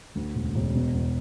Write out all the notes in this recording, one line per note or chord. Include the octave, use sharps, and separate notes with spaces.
D2
E1
E1
B2
E2